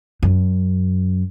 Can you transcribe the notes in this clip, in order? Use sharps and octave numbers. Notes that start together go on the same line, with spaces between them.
F#2